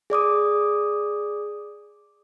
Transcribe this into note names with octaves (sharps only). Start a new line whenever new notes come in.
G#4 D5 D6 D#6